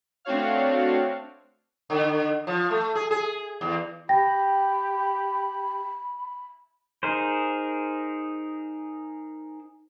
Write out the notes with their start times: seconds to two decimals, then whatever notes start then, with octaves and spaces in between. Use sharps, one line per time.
0.25 A3 C4 D4 F#4 C#5 F5
1.90 D3
2.47 F3
2.71 A3
2.95 G#4
3.11 G#4
3.61 E2
4.09 G4 G5 B5 A#6
7.03 D#4 G#4 A#4 C5